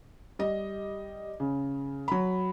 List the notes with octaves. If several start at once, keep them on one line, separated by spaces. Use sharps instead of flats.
G3 D#5
C#3
F#3 B5